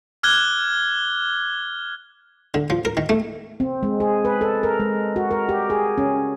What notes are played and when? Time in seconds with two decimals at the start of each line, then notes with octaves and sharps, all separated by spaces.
0.23 D6 F6 F#6 G#6 G7
2.54 D3
2.70 F3
2.85 A#4
2.97 D#3
3.09 A3
3.60 C4
3.83 G#3
4.00 G#4
4.25 B4
4.41 A4
4.63 A#4
4.80 G#3
5.16 F#4
5.31 A#4
5.49 G4
5.70 G#4
5.98 C#4